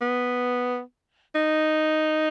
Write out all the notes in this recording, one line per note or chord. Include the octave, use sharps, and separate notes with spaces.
B3
D#4